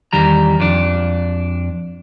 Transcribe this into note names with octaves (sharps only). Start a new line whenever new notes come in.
E2 D#3 G3 A#5
F2 D4